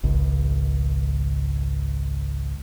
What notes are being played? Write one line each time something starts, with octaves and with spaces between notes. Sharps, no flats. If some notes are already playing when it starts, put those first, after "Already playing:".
G#1 C#2